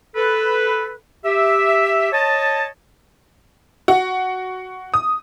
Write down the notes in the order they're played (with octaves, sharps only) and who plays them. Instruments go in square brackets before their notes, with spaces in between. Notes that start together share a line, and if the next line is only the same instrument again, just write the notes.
[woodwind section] A4 B4
G4 E5
C#5 D#5 A5
[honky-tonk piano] F#4
D#6